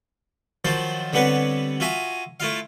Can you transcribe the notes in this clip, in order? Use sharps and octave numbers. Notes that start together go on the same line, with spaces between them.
D#3 F3 F#3 C5 A5
D3 G3 B3 C4 B4 C#5
F4 F#4 E5 G#5 A#5 D#6
A3 E4 F4 F5